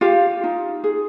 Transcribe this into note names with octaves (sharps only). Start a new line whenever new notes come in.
F4 G4 F5
D#4
G#4